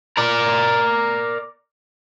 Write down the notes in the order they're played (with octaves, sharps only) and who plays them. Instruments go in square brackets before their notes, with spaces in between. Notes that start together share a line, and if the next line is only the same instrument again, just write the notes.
[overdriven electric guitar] A#4 D5